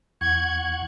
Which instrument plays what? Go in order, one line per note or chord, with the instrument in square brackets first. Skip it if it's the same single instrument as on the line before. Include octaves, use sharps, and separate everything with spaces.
[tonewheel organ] E2 F#5 C#6 [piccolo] G#6